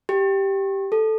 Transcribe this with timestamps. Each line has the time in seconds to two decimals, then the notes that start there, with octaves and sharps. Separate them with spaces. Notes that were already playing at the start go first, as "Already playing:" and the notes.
0.09 G4
0.92 A4